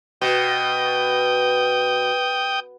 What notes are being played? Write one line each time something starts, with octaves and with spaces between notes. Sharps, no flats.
B2 G5 D#6